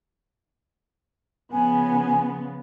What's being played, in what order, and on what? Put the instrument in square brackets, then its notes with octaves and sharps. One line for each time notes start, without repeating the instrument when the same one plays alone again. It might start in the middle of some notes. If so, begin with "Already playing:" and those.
[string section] C#3 F3 B3 [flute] G#5